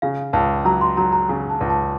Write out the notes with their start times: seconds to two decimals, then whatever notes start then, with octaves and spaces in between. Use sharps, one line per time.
0.02 C#3 F5
0.33 C#2 A5
0.65 F#3 A#5
0.81 C6
0.97 F#3 A#5
1.13 A#5
1.29 C#3
1.50 A5
1.61 C#2
1.70 A5